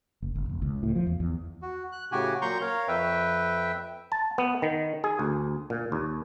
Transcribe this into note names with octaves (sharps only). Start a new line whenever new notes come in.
F#1
F#1
E1
C#2
A2
F3
E2
E2
F#4
F#6
A2 C#3 F#4 G4 G#5
A#2 F#3 A#5 C6 C#6 G6
A#4 C#5 F5
F2 B4 E5 G5
A5
B3
D#3
G#4
D2
A#2
D#2